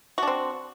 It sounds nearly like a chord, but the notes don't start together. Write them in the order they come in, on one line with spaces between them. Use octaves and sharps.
F#4 D4 C4